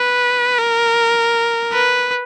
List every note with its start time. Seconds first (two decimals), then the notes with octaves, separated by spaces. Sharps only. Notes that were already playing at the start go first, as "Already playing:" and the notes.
Already playing: B4
0.59 A#4
1.73 B4